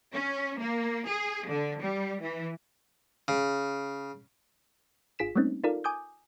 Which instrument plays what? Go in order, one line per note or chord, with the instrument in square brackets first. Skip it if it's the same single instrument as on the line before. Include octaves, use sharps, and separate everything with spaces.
[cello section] C#4
A#3
G#4
D3
G3
E3
[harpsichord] C#3
[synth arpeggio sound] G#1 F4 G#4 B6 E7
G3 A3 A#3 C4 C#4 D#4
D#4 F4 A4 A#4 D5 F5
G#5 D6 D#6 G6